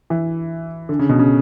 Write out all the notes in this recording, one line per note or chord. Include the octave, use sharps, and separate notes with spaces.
E3
D3
C#3
B2
C#3